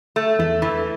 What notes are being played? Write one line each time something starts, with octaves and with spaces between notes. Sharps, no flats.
A3
E2 A3
E3